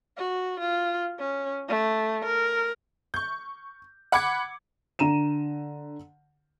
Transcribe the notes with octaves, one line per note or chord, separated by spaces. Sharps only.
F#4
F4
C#4
A3
A#4
C#6 G6
F#5 B5 D6 G#6 C#7
D3 A#5 D#7 E7